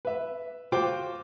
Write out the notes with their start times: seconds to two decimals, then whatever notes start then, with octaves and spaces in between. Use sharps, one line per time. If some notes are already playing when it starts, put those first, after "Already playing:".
0.05 B4 E5
0.72 F4 F#4 C5 F5 G5 D6